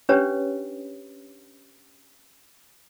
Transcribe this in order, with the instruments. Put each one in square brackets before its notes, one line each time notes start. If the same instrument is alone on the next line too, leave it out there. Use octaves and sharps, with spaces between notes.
[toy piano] C#4 D4 G4 B4 C#5